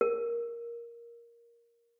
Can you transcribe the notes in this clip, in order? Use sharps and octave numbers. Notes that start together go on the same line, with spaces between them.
A#4